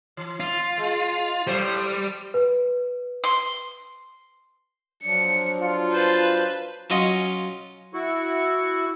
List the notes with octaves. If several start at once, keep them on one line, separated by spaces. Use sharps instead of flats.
E3
F4
G#3
A2 G3 C5
B4
C6
F3 F#3 D4 C#7
F4
B4 C5 A5
F#3 C#4 F4 D#5
E4 F#4 C#6